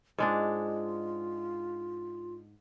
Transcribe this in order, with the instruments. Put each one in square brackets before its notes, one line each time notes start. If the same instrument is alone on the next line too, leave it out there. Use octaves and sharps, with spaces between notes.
[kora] G#2 G#3 D4 [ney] F4